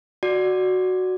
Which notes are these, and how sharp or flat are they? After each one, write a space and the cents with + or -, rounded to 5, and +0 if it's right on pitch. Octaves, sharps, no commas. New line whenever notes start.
F#4 +0 D5 +10